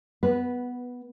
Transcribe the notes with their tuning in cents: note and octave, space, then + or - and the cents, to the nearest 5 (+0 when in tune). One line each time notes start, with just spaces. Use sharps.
B3 +0 B4 -10